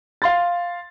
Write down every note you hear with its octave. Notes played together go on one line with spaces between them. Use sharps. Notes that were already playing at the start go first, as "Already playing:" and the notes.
F5 C6 A6